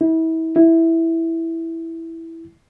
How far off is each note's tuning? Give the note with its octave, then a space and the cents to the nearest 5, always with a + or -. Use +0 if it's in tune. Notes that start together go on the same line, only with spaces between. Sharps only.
E4 -35
E4 -5